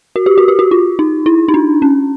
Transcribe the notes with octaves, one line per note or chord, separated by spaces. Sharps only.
F#4
G4
F#4
G4
F#4
F4
D#4
E4
D#4
D4
C#4